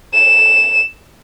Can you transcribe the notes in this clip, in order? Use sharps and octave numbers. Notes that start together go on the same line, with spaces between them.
E7